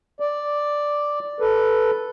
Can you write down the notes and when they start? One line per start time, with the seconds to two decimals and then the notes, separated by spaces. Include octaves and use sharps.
0.20 D5
1.40 A4 B4